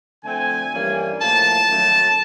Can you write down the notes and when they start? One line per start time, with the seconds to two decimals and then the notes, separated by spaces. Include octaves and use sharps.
0.24 D3 F3 A3 C4 G#5
0.71 G2 E3 G3 A#3 C#4
1.20 A2 F3 A#3 A5
1.68 F#2 D#3 F#3 A3